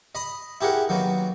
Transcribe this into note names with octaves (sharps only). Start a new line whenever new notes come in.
D#5 B5 D#6
E4 G4 G#4 A#4 F#5
D#3 F#3 A#3 B3